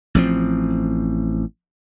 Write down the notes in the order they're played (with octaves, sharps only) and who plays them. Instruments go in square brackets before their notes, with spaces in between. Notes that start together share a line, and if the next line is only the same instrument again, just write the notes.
[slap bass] A1 F3 C4